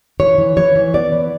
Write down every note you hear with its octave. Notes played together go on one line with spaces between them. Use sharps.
E3 C#5
E3
E3 C#5
E3
B3 D5
E3